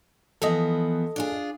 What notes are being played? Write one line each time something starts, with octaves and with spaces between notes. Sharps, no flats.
E3 F3 B3 A4 D#5
D4 F4 G#4